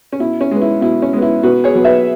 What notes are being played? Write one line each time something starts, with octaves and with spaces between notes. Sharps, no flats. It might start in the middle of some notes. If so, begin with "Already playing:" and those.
C#4
B2 E4
C#4
G#3 B3
E4
B2 E4
C#4
G#3 B3
E4
B2 F#4 B4
G#4 C#5
F#3 B3
B4 E5